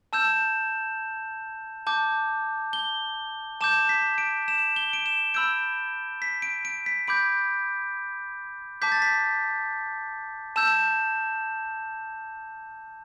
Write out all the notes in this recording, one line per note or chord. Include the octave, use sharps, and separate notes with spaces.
A5 E6 G6 E7
A5 D6 G6
G7
A5 D6 G6 E7
B6
D7
E7
G7
D7
E7
B5 E6 G6 D7
B6
D7
D7
B6
B5 D6 G6 D7
A5 D6 G6 B6
A6
B6
A5 E6 G6 E7